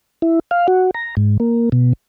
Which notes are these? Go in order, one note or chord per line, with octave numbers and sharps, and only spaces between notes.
E4
F5
F#4
A#5
G#2
A#3
B2